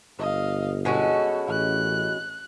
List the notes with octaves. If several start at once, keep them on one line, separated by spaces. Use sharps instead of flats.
G1 D#5 F5
B2 G#3 C#4 F#4 A4
A1 F#6